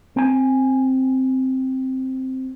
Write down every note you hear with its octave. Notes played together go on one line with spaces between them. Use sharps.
C4 G#5